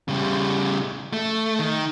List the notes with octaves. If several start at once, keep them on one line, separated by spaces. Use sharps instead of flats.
C#3 G3
A3
D#3